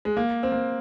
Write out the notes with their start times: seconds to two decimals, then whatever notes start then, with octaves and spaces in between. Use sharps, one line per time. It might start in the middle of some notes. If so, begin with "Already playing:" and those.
0.05 G#3
0.17 A#3
0.43 C4
0.52 A#3